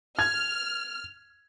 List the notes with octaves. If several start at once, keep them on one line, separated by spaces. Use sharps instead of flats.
F6 G#6